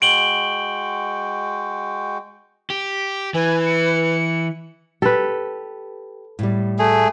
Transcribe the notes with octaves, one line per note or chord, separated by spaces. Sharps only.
G#3 F#4 G5 D7 F#7 G7
G4
E3 B4 G#5
C#7
G4 A4 B4
A2 G3
A3 G#4